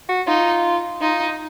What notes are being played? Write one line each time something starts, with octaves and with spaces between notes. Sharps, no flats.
F#4
D#4 F4
D#4 F4
D#4